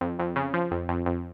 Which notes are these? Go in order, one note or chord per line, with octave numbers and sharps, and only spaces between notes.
F2
F2
C#3
F3
F2
F2
F2